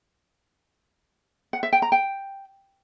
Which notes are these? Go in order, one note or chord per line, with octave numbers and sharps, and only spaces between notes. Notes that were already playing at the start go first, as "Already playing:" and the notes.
F#5
E5
G5
A#5
G5